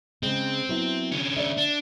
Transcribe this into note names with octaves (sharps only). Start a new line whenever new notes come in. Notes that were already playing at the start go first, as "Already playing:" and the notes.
C#3 G#3 C4
F#3 B3 E4
D3 C#4
C#5 D5 E5
D4